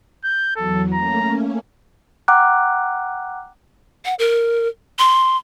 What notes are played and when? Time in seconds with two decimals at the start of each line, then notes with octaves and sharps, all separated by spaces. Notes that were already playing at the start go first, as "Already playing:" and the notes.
0.24 G6
0.56 E2 F#3 A4
0.93 A3 A#3 C#4 A#5
2.28 F#5 G5 A#5 D6 F6 F#6
4.05 F#5
4.19 A#4
4.99 C6